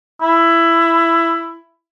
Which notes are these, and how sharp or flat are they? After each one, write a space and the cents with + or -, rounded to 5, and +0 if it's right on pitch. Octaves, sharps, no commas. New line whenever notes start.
E4 +15